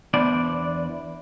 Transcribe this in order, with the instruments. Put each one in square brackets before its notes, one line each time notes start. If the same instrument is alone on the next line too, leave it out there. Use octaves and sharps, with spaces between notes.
[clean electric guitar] E2 B3 D4 C5 D5